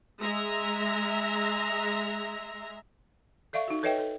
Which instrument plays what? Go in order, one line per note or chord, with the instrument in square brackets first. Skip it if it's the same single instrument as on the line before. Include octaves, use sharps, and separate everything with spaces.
[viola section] G#3 E5 A#5
[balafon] A4 D5 E5 F5 C#6
D#4 F#4
A4 B4 C#5 D#5 E5 G5
A4